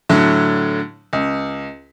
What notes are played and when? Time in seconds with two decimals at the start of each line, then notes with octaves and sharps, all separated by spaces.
0.09 A2 D3 F#3
1.13 C#2